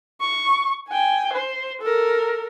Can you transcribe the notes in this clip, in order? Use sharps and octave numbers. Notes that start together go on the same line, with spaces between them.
C#6
G5 G#5
C5
A4 A#4